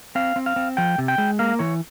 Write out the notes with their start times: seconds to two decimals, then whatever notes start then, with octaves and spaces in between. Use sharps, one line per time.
0.15 C4 F5
0.36 C4
0.46 F5
0.56 C4
0.77 F3 G5
0.98 C3
1.08 G5
1.18 G#3
1.39 A#3 F5
1.59 E3 C#5